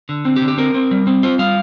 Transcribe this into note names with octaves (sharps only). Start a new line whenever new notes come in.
D3
C4
G4
D3
G4
C4 A#4
C4
G3
C4
F4 C5
G3 F5